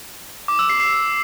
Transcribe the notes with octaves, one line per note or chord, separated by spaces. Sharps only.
D6
E6
C7
C7